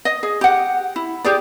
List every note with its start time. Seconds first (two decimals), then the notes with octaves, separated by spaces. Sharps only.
0.05 D#5
0.23 G#4
0.41 G4 F#5
0.96 E4
1.24 G4 G#4 D5